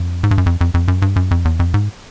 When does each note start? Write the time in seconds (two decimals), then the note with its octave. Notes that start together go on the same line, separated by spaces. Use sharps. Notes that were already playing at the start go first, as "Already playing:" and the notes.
Already playing: F2
0.23 G#2
0.31 G2
0.38 F#2
0.46 F2
0.61 F2
0.74 F2
0.88 F#2
1.02 G2
1.16 F#2
1.31 F2
1.45 E2
1.60 F2
1.74 G#2